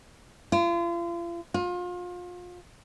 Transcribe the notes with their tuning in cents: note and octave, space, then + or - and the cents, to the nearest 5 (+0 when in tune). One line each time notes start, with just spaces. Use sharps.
F4 -40
F4 +30